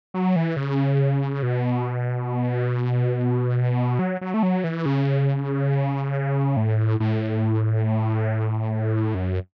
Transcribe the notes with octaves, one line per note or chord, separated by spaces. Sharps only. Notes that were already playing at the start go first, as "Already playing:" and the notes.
F#3
E3
C#3
B2
F#3
F#3
A3
F#3
E3
C#3
A2
A2
F#2